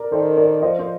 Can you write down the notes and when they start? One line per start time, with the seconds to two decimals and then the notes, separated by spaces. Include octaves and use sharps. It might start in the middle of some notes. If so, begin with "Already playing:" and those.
Already playing: A#4 D5
0.12 D#3 A4 C5
0.37 A#4 D5
0.62 F3 C5 D#5
0.79 C5